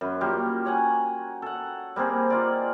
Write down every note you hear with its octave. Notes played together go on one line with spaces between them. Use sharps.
F#2 B4
G3 A#3 F4 G4
C#5 F#5 G#5
A4 F#5
G3 A#3 C4 G#4
D#4 F4 D5